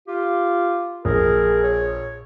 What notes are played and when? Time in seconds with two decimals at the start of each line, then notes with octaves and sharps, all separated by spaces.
0.08 F4 G4
1.05 A#1 G#4 A#4
1.64 C#5